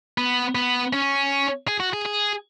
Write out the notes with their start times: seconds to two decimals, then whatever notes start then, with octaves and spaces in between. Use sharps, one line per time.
0.18 B3
0.55 B3
0.93 C#4
1.68 G#4
1.80 F#4
1.93 G#4
2.05 G#4